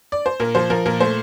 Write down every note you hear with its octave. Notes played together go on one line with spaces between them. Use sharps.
D5
C5
A#2 A#4
F3 C5
F3 A#4
A#2 A#4
A3 C5